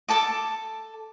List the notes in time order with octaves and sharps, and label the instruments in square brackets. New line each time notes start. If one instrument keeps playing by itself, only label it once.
[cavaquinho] A4 A5 D6